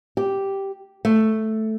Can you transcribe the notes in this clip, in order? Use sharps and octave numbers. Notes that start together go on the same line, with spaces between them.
G4
A3